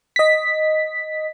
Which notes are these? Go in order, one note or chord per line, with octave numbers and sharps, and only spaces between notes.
D#5 B6